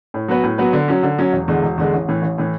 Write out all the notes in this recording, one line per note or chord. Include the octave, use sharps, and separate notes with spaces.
A2
F#3 B3 F#4 B4
A2
F#3 B3 F#4 B4
D3
F#3 C#4
D3
F#3 C#4
E1
E2 D3 G#3
E1
E2 D3 G#3
A1
A2 E3
A1
A2 E3